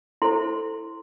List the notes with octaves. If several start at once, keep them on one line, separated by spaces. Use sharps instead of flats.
E4 A4 C5 C6